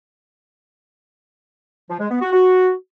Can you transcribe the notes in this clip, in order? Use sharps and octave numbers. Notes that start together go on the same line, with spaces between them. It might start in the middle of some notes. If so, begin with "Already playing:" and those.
F3
G#3
B3
F#4
F#4